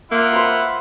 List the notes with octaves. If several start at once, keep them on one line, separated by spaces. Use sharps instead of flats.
A#3 F4 E5 F#5
C5 B5